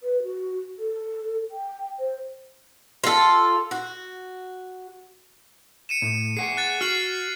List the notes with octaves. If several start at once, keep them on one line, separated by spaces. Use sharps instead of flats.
B4
F#4
A4
G5
C5
F4 A4
F#4
C#7 D#7 E7
A2
G#4 F#5 G#5 C7
F#6 A6
F#4 F6 C7 F#7